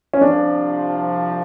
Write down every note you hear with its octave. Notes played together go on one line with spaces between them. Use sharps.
C#4
C2 C3 F3 D4